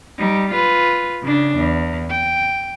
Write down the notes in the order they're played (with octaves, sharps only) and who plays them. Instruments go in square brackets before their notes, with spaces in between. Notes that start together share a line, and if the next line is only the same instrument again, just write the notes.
[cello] G3 D#4
F4 B4
C#3 D4
E2
G5